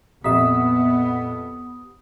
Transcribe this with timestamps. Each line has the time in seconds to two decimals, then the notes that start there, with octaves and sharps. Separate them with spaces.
0.24 F2 A#2 B3 G4 E5 D#6 B6